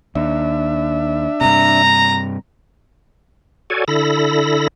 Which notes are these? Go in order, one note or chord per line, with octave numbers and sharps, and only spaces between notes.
D#2 D4 E5
G2 C3 A#5
F#4 A4 C#5 D5 G#5
D3 E4 A4 B5 A#6